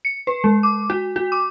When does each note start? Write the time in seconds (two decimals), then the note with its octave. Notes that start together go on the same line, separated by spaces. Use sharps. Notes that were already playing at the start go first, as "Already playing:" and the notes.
0.05 C#7
0.27 B4
0.44 G#3
0.63 D6
0.90 F#4
1.16 F#4
1.32 D6